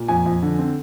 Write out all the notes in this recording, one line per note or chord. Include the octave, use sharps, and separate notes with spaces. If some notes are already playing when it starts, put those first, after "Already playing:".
Already playing: A#2
F2 G#5
F2
D3
C4